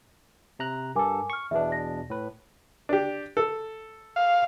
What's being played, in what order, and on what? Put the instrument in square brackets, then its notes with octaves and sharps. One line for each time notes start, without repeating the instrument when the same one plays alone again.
[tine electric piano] C3 A#5 F#6
[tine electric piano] G2 A4 [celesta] A#4 G#5 D6
[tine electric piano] C#6 [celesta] F6 C#7
[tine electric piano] E2 B2 D4 [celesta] B4 E5
[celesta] A#6
[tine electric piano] A2 B4
[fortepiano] D4 G4
A4
[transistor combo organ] F5